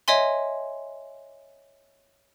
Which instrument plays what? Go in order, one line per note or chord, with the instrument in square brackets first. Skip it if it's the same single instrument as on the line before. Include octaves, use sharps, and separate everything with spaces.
[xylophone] C#5 D#5 E5 G#5 C6